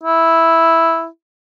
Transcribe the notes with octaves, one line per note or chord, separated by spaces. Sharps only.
E4